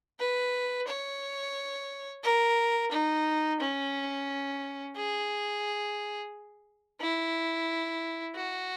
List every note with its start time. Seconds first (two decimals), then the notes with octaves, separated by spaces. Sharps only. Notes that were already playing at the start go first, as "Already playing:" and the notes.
0.19 B4
0.87 C#5
2.23 A#4
2.91 D#4
3.60 C#4
4.96 G#4
7.01 E4
8.36 F#4